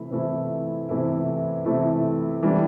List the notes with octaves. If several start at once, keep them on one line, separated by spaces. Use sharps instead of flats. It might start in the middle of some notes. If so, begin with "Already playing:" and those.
Already playing: C3 E3 A3 E4
C3 E3 A3 E4
C3 E3 A3 E4
C3 E3 A3 E4
E3 G3 D4